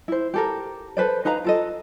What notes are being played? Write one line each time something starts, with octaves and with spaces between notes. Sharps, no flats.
E4 C5
G4 A4 A#4
A4 B4 C5 D5
D#4 B4 F5 A#5
F4 A4 D#5